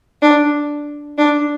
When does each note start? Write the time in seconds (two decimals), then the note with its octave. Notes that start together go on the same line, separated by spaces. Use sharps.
0.22 D4
1.18 D4